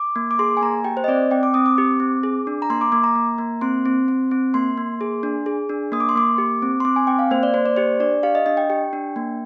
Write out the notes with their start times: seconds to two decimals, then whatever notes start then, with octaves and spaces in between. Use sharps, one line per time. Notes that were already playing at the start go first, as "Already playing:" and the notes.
Already playing: D6
0.16 A#3
0.31 D6
0.39 G#4 C6
0.57 G#5
0.61 A#3 A#5
0.85 G4 G5
0.97 C5
1.04 D#5
1.08 C4 D5
1.31 C4 G5
1.43 D6
1.54 C4 D#6
1.66 D6
1.78 G4
2.00 C4
2.23 G#4
2.47 D4
2.62 A#5
2.70 A#3 C6
2.81 D6
2.92 A#3 D6
3.04 A#5
3.15 A#3
3.38 A#3
3.61 C4 C6
3.86 C4
4.08 C4
4.31 C4
4.54 A#3 C6
4.77 A#3
5.01 G#4
5.23 D4
5.46 G#4
5.69 D4
5.92 A#3 D#6
6.00 D6
6.09 C6
6.15 A#3 D6
6.38 G4
6.62 C4
6.80 C6
6.85 C4 D6
6.96 G#5
7.07 C4 G5
7.19 F5
7.31 A#3 C5
7.43 D5
7.54 A#3 C5
7.66 D5
7.76 G4 C5
8.00 D4 D5
8.23 G4 F5
8.35 D#5
8.46 D4 D#5
8.57 G5
8.69 G4 G5
8.93 D4
9.16 A#3